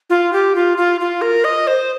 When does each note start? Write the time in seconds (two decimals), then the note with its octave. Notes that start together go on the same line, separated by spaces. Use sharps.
0.10 F4
0.33 G4
0.55 F4
0.78 F4
1.00 F4
1.22 A#4
1.44 D#5
1.67 C5